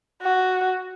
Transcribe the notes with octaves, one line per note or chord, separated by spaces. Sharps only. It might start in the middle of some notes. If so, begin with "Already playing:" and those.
F#4